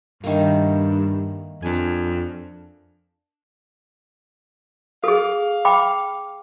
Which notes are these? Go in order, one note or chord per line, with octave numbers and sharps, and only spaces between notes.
G2 D#3 A3 A#3
F2 D4 G#5
G#4 A4 F5
G5 B5 D6